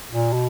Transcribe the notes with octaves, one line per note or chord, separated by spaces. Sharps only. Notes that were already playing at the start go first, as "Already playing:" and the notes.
A#2
B2